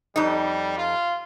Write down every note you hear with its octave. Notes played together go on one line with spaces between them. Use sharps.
F2 G3 D#4
F4